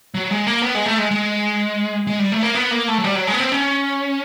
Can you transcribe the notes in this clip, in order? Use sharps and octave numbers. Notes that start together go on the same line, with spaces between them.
F#3
G#3
A#3
B3
G#3
A3
G#3
G#3
G#3
G3
A3
A#3
B3
A#3
A3
F#3
G3
F#3
G#3
B3
C4
C#4